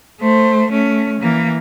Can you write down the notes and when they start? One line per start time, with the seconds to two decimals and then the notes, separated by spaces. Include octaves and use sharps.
0.21 A3 C5
0.71 A3 C#4
1.21 E3 A#3